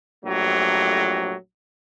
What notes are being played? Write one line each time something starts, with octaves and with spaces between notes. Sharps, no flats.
A#1 F2 F#3 A3 G4